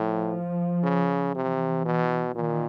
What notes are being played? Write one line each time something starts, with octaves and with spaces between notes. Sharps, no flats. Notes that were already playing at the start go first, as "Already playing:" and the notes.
Already playing: A2 F3
C#3
C3 E3
B2
A#2 D#3